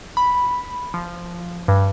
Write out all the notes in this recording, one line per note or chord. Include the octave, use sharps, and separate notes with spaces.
B5
F3
G2